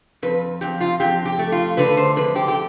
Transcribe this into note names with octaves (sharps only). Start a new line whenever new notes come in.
F2 B4
F2 G4
F4
F2 G4
G4
A3
F4
D3 B4
C5
F2 B4
G4
G4